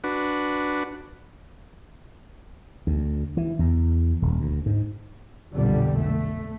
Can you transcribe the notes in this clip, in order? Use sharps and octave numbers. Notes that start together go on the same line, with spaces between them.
D4 F#4 B4
D2
E3
E2
D#1
D2
G#2
B1 F2 A#2 D3 G3
A3